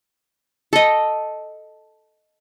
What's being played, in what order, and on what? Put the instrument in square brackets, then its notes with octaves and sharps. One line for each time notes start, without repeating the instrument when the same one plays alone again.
[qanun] A4 D#5